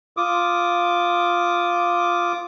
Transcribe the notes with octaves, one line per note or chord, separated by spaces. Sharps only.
F4 D6 D#6